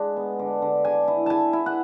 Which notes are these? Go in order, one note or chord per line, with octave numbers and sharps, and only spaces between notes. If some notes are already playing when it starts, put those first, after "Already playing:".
Already playing: G#3 D4 F#5
B3
D3
D3
D3 G#5
E4
E4 G#5 A5
E4
F#5